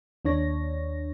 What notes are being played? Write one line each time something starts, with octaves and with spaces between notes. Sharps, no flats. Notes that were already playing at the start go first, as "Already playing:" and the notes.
D#2 D4 C#5 A#6